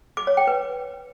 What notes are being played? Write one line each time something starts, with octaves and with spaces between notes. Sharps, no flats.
D6
C#5
G5
B4